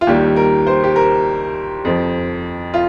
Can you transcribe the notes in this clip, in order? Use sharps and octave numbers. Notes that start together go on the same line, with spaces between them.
F4
D#2 D#3 G3 G4
A#4
C5
G4
A#4
F2 F3
F4